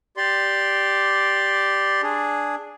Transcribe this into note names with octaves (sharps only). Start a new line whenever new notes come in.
G4 D5 C6
D4 G#4